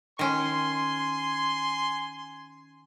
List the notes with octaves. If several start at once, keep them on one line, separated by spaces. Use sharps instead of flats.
D#3 C#4 G#5 C6